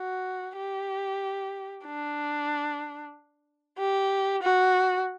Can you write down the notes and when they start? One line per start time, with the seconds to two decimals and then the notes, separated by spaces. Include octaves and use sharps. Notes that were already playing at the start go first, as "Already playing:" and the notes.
Already playing: F#4
0.57 G4
1.86 D4
3.78 G4
4.42 F#4